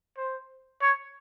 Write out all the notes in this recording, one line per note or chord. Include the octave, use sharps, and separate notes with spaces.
C5
C#5